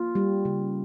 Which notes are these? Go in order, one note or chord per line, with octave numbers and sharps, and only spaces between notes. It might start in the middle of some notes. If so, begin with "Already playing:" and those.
Already playing: A#3 F4
G3
C#3